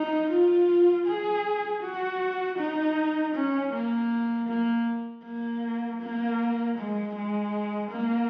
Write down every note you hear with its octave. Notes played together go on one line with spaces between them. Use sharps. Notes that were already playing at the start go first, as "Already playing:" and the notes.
Already playing: D#4
F4
G#4
F#4
D#4
C#4
A#3
A#3
A#3
A#3
G#3
G#3
A#3